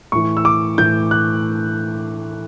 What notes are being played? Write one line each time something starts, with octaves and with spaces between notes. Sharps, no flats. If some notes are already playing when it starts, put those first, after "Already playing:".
A2 E3 C#6
E6
D6
A2 E3 G6
F#6